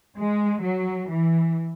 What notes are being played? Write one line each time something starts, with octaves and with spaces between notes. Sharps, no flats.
G#3
F#3
E3